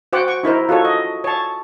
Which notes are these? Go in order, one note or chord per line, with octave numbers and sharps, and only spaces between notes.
F#4 C5 F#5 G5 D6
C#6
D#4 E4 A#4 C5
F4 F#4 A4 C#5
D#5
C#5 A5